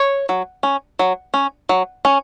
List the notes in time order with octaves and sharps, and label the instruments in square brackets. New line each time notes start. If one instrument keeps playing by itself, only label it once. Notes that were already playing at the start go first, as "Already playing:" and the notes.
Already playing: [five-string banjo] C#5
F#3
C#4
F#3
C#4
F#3
C#4